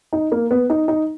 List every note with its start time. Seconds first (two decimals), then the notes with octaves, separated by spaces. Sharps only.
0.13 D#4
0.32 A#3
0.51 B3
0.70 D#4
0.88 D#4